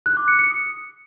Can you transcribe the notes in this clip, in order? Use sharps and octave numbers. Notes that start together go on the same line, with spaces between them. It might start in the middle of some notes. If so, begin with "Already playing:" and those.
F#6
D6
C#7
C#7
D#6